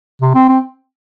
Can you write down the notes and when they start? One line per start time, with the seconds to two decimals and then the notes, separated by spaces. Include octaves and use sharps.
0.21 C3
0.35 C4
0.49 C4